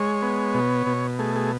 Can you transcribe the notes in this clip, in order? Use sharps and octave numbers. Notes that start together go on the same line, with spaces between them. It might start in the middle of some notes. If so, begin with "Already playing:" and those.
Already playing: G#3 C#5
B3
B2
B2
A3 G#4
G#4